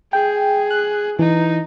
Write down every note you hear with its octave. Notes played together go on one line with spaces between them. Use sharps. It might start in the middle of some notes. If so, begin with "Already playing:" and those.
G#4 G5
F#6
E3 D#4